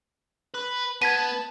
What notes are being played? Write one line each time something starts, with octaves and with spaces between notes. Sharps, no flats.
B4
B3 A5 G#6 B6 D#7